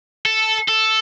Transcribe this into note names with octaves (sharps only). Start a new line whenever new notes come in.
A4
A4